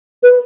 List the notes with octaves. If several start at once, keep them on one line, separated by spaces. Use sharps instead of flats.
B4